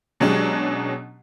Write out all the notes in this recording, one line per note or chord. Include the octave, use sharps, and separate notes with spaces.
B2 F#3 G#3 C#4 D4 G4